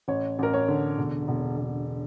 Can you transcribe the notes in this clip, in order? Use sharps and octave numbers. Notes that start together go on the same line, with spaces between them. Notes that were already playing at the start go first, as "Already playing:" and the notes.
A1 C#5
A1 A#4
C#5
D3
E1
E1
E1